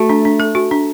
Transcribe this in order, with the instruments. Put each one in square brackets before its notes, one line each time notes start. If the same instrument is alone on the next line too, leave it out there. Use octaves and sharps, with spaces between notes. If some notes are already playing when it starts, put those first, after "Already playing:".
Already playing: [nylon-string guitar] A3 [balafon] F#4
[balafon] D4
D4
A4
F#4
D4